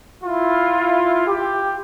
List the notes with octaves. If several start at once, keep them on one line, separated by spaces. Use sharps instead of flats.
E4 F4
G4